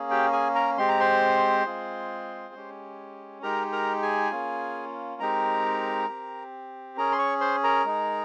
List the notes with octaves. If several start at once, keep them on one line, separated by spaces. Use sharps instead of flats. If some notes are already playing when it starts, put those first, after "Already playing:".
Already playing: A#3 C#4 G#4
G4 G5
G#4 G#5
A#4 A#5
G#3 C4 G4 C6
A#5
C5 C6
G#3 C4 F4 G#4
G#3 C#4 G4
G#3 D#4 G4 A#4 A#5
A#4 A#5
G#4 G#5
A#3 C#4 F4
G#3 C4 D#4 G4 A#4 A#5
C4 G4
C#4 G#4 A#4 A#5
C6
C#5 C#6
C5 C6
A#4 A#5
G#3 D#4 G#4